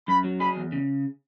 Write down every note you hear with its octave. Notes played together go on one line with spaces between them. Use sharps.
F#2 B5
F#3
G#4 B5
E2
C#3